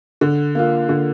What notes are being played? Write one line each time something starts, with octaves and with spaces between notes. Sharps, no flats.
D3
A#3 F4
D3